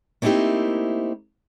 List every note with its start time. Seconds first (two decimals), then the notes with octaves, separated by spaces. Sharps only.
0.22 A3 A#3 C4 D#4 E4 G4